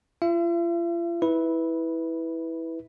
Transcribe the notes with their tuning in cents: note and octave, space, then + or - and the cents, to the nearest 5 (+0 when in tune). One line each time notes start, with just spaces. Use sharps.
F4 -40 E5 +45
E4 -15 B4 +0